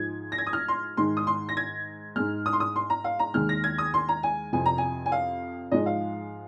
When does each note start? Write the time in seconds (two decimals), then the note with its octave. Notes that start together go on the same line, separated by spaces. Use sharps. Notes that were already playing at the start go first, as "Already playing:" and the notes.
Already playing: G#2 F3 G#3 G#6
0.32 A#6
0.38 G#6
0.47 D#6
0.53 F6
0.68 C6
0.97 G#2 D#3 G#3 C6
1.17 D#6
1.27 C6
1.49 A#6
1.57 G#6
2.16 G#2 G#3 F6
2.46 D#6
2.53 C6
2.60 D#6
2.76 C6
2.90 A#5
3.04 F5
3.19 A#5
3.34 D#2 D#3 G#3 F6
3.49 A#6
3.64 G#6
3.78 D#6
3.94 C6
4.09 A#5
4.23 G#5
4.53 F2 C3 F3 G#5
4.66 A#5
4.78 G#5
5.06 G#5
5.12 F5
5.71 G#2 F3 G#3 D#5
5.86 F5